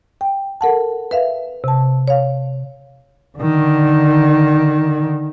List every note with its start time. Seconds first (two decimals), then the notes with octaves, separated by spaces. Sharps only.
0.21 G5
0.61 A4 A#4 F#5 A5
1.11 B4 E5 F5
1.64 C3 A5
2.08 C#5 F5
3.38 D3 D#3